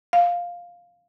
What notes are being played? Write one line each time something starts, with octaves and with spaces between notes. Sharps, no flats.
F5